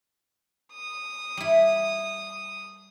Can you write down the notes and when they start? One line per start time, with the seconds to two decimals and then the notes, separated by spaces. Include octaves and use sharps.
0.73 D#6
1.37 G3 E4